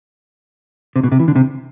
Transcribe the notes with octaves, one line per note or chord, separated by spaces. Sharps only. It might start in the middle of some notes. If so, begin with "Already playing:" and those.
C3
B2
C3
E3
D3
C3